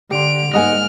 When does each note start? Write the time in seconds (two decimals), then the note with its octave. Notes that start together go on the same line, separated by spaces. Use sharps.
0.11 D3 G4 D5 C6 D7 F7
0.54 G#2 G3 G#3 A#3 D#5 F#5 G#5 F6